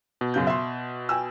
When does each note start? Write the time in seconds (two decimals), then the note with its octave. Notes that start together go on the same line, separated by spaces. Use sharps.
0.21 B2
0.34 F#2 C#3 G6
0.47 E5 C6
1.09 G5 G#5 E6